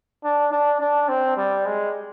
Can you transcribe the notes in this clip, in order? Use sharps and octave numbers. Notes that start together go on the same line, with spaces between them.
D4
D4
D4
C4
G3
G#3